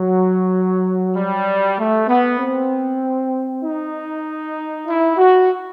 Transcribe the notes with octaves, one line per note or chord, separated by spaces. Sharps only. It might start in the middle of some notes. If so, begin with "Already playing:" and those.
Already playing: F#3
G3
A3
B3
C4
D#4
E4
F#4